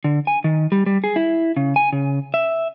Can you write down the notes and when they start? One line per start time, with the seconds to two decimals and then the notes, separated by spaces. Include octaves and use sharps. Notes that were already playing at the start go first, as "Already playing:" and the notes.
0.04 D3
0.27 G#5
0.44 D#3
0.72 G3
0.86 G3
1.04 G#4
1.16 E4
1.57 C#3
1.76 G#5
1.93 C#3
2.34 E5